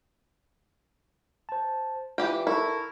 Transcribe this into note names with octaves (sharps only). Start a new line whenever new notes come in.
C5 A5
E3 F4 G4 G5
E4 A4 A#4 C#6